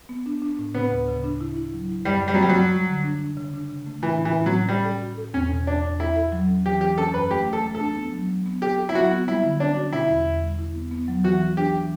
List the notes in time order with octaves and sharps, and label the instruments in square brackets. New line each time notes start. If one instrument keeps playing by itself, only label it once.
[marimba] B3
D4
D4
A2
[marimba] C#3 [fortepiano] B3
[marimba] D2
C#3
D4
E4
E4
F#3
E4
[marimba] F#2 [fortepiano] G3
[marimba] F#2 [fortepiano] G3
[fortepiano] F#3
[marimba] F#2 [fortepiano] G3
[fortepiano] F#3
[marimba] F#2
G3
D3
D4
D4
C#3
D4
C#3
A3
[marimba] A2 [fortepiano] E3
[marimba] C#4
[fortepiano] E3
[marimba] A2
[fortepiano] F#3
[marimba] C#4
[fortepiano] G3 [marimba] C#4
[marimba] A4
F#4
A4
[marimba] E2 [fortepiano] C#4
[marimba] B2
[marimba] E2 [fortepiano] D4
[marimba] E2
[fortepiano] E4 [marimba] A4
[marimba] A4
F#3
C#4
[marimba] E3 [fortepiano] G4
[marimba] E3 [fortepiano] G4
[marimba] C#4 [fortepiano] A4
[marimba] F#2 [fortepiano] B4
[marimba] A3 [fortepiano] G4
[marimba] A3
[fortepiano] A4
[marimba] A3
[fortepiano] A4
[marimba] D4
B3
F#3
F#3
B3
[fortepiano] G4 [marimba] A4
[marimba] A4
[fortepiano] E4
[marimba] F#3 [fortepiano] F#4
[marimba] B3
[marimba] G3 [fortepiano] E4
[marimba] D3
[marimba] C#4 [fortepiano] D4
[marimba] F#4
[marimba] B2 [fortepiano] E4
[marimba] E2
E2
G3
E4
B3
B3
F#3
[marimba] E3 [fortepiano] F#4
[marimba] E3
[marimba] D4 [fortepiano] G4
[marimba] E3